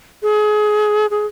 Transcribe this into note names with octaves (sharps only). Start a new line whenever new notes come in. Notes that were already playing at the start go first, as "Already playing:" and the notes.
G#4
G#4